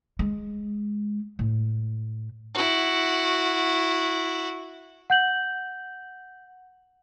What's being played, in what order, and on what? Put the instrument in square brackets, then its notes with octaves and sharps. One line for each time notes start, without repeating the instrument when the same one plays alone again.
[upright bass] G#3
A2
[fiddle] E4 F#4
[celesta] F#5 G6 F#7